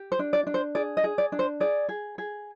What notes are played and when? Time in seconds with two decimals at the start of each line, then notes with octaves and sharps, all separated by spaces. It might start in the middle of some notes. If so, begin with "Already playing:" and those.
Already playing: G4
0.12 C5
0.19 D4
0.33 D5
0.47 D4
0.54 C5
0.75 G#4 D5
0.97 D#5
1.04 G#4
1.18 D5
1.32 D4
1.39 C5
1.60 G#4 D5
1.89 G#4
2.18 G#4